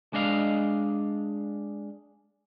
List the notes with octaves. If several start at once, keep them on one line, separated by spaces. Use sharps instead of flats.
G#3 D4 D#5 F5